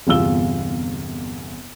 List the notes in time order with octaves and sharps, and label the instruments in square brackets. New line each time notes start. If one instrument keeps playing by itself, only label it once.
[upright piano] G1 E2 C3 F4 E6 G7